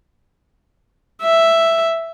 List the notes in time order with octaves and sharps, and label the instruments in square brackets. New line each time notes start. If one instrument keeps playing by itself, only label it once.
[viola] E5